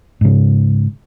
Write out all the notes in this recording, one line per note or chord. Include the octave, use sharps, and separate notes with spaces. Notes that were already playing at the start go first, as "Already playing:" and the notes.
G#2 C#3